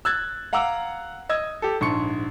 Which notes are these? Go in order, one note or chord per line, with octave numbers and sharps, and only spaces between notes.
E6 F#6 G#6 A6
F5 F#5 A#5 D6 E6
D#5 E6 G#6
G4 A4
A#1 G#2 C6 C#6 C#7